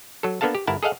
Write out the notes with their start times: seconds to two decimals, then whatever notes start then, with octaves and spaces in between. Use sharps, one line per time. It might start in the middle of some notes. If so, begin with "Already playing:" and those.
0.23 F#3 A4
0.41 A#3 B3 D4 A4 F5 A5
0.55 G4
0.67 G1 E4 A#4 F#5 A5
0.83 G#4 A4 D#5 F5 F#5